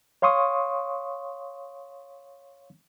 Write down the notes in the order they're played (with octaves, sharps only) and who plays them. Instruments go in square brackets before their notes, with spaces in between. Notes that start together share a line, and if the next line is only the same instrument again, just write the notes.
[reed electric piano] C#5 F5 C6 C#6 D#6